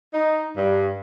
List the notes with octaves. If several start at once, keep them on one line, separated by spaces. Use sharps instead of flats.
D#4
G2